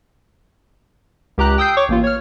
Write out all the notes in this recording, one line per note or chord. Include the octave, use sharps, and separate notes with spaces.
C#2 G4 A#5 F#6
G5 D#6 E6 G6 C7
C#5 C#6 D6
A1 A#3 F4
C#5 F6